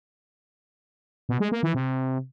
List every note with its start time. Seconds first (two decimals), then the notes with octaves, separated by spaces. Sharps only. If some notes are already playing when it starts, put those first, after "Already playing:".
1.29 B2
1.40 G#3
1.52 A#3
1.63 E3
1.74 C3